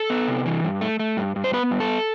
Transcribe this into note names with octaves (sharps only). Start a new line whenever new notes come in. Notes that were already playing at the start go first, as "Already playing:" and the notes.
Already playing: A4
B3
C3
E3
G2
A3
A3
G2
G2
C5
B3 B4
G2
A4